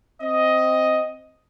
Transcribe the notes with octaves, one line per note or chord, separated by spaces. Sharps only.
C4 D#5